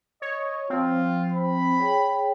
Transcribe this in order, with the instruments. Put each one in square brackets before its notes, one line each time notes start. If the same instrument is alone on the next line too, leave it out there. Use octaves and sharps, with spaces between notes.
[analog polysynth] C#5 [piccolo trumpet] D#5
[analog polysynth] F3 C4 [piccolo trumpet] F4
[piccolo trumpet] B5
[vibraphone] G#4 C#5 G5